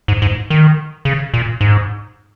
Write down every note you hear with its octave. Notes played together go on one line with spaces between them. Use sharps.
G#2
G#2
D#3
C#3
A#2
G#2